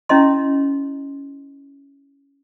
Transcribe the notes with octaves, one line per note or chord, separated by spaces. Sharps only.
C#4 E4 D#5 C6